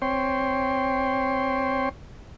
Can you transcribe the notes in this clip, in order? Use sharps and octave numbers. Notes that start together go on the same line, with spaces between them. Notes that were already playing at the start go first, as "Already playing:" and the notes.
C4 C#5 G5 C6